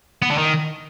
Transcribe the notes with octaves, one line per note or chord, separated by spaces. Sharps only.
B3
D3
D#3